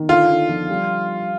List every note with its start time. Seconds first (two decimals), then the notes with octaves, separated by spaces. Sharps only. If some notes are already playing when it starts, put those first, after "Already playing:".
Already playing: D#3
0.09 D3 F4
0.30 D3
0.49 F3
0.70 G3